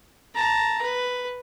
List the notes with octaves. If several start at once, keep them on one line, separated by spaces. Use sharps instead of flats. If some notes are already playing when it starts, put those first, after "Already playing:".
A5 A#5
B4